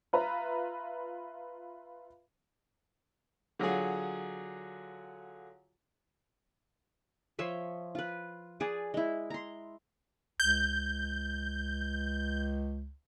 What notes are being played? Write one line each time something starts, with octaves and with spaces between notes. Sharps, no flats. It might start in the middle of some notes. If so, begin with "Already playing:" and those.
F4 B4 E5 A#5
D3 F#3 F4 G#4
F3 C#5 E5 C6
F4 B4
G#4 B4 D5 A5
G#3 E4
A#5 C6
C#2 G6